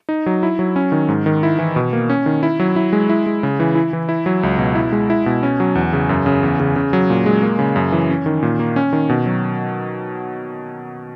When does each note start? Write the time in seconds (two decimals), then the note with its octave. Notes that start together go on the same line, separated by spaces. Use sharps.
0.09 D#4
0.26 F#3
0.43 E4
0.59 F#3
0.76 C#4
0.92 D#3
1.09 G#2
1.26 D#3
1.43 E4
1.59 E3
1.76 B2
1.93 A#3
2.10 C#4
2.26 D#3
2.43 E4
2.60 F#3
2.76 E4
2.93 G#3
3.09 E4
3.26 G#3
3.43 C#3
3.60 E3
3.75 E4
3.93 E3
4.09 E4
4.26 F#3
4.43 C#2
4.59 B2
4.75 E4
4.92 G#3
5.10 E4
5.26 B2
5.43 C#4
5.60 F#3
5.75 E2
5.93 C#3
6.09 F#2
6.26 C#3
6.43 E2
6.60 C#3
6.76 C#3
6.93 F#3
7.10 A#2
7.26 G#3
7.43 A#3
7.59 C#3
7.76 F#2
7.92 E3
8.10 C#4
8.26 D#3
8.42 A#2
8.59 A#3
8.76 C#4
8.93 D#3
9.09 B2
9.26 F#3